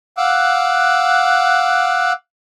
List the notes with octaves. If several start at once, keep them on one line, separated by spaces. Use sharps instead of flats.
F5 F#5 D6 E6 F#6